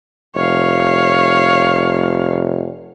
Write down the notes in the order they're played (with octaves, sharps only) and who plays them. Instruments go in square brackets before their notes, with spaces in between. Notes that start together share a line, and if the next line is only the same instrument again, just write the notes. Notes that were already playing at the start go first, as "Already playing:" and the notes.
[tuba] F1 [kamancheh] C#5 F5